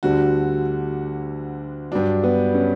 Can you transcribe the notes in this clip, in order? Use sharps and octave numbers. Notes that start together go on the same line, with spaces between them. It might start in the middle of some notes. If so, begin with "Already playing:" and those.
D2 D3 G3 F#4
G2 F#3 D4
B3
C#4